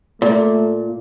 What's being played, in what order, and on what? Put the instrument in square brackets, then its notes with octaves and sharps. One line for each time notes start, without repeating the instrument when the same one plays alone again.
[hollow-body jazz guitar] A#2 [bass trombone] A3